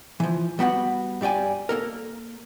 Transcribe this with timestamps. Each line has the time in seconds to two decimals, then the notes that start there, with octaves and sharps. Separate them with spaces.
0.20 E3 F3
0.59 G3 B3 F#4 F#5
1.21 G2 G3 D5 G5 G#5
1.69 A#3 A4 A#4